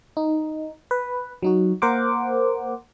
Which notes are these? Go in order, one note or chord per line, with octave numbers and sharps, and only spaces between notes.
D#4
B4
F#3 D#4 F#4
A#3 A#4 C5 F#5 D6